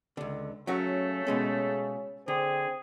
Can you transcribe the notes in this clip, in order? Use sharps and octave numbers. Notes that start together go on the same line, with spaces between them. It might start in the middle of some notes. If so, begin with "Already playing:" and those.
C#2 D3
C#3 F#3 A3 C#4 F#4
B2 G#3 C#4
D3 C4 G#4